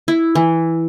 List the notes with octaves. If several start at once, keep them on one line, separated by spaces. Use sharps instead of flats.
E4
E3